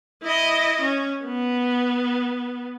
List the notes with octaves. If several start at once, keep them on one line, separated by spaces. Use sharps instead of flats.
E4 D#5
C#4
B3